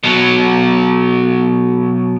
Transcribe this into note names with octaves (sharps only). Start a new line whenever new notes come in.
B2 F#3